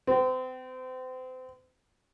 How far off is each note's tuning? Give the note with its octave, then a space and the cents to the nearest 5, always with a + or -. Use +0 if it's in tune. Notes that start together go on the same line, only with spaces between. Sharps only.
C4 -35